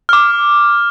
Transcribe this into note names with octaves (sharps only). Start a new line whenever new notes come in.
D6 F6